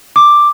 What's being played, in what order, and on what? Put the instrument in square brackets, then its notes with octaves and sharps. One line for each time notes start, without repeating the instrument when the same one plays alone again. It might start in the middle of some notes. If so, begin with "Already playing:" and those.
[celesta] D6